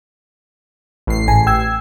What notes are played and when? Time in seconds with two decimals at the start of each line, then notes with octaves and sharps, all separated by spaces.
1.07 A1 C7
1.28 G#1 A2 G#5
1.47 G5 E6 G#6